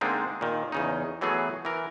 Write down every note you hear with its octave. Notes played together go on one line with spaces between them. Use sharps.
D3 G#3 A#3 C4 D4 D#4
A#2 D#3
E2 C#3 D#4
E3 F#3 A3 B3 G#4
E3 A#4